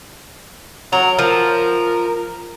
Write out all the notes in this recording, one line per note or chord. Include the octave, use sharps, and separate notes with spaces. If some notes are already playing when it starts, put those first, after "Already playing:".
F#3 A#4
F3 A#4